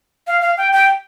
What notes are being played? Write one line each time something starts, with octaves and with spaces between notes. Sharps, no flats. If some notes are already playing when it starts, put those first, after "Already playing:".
F5
F5
G5
G5